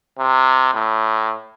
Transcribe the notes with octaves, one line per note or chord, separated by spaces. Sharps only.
C3
A2